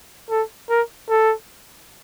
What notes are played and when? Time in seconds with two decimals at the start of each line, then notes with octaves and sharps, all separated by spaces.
0.30 A4
0.70 A#4
1.09 A4